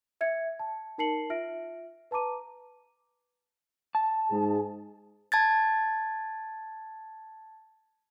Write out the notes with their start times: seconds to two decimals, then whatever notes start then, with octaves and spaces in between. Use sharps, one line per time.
0.21 E5 G#6 C#7
0.59 A5
0.98 D#4 A#4 A5 C7 C#7 F#7
1.30 F4 E5 F6 A#6 D7
2.11 B4 A5 A#5 D6 D#7
3.95 A5
4.32 G#2 G#4
5.32 A5 G#6 A6